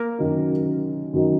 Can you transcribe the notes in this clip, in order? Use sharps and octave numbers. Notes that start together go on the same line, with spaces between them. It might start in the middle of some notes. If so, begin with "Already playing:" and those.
Already playing: A#3 A#4
F#2 D#3 F#3 D#4
F#2 D#3 F#3 D#4